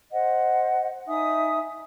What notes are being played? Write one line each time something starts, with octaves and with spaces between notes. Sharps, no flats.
C5 D#5 F#5
D#4 E5 G#5 D#6